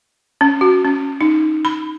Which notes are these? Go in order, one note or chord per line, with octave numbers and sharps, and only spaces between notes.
C#4
F#4
C#4
D#4
B5